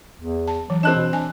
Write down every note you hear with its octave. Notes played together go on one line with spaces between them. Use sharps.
E2
A5
E3 F#3
C4 D4 D#5 F#6 E7
B2
D4 G#5